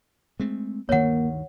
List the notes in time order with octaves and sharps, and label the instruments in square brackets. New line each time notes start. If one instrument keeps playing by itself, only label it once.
[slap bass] G#3 A3 C4
[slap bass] D2 G2 D#3 [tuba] A#3 [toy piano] C#5 F#5